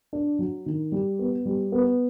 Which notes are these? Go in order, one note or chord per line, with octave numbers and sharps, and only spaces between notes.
D4
F#3
D#3
G3
B3
G3
B3